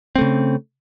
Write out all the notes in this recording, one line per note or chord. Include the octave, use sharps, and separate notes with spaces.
C#3 A3 C4